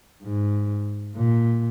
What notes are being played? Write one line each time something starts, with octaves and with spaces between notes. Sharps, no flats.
G#2
A#2